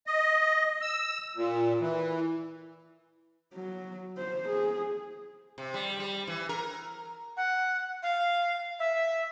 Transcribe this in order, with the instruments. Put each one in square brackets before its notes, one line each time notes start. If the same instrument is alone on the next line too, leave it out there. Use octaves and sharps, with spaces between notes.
[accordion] D#5
E6
A#2
E3
[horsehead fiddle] F#3
C5
G#4
[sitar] C3
G3
G3
E3
A#4
[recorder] F#5
F5
E5